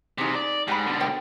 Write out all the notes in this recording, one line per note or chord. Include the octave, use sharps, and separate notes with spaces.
E2 C3 D#4 G#4
D5
G#2 G4 B5
B2 D3
C5 G5